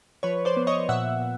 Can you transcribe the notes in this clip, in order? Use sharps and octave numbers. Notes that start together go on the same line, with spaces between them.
F3 B4 C#5
C5 D5
B3
C#5 D#5
A#2 E5 F#5
A#2